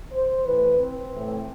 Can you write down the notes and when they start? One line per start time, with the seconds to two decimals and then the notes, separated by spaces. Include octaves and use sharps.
0.12 C5
0.46 A2 E3 B4
0.80 C4
1.13 A2 E3